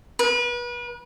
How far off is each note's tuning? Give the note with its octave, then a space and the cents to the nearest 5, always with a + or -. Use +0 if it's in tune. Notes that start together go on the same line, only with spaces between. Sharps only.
B4 -35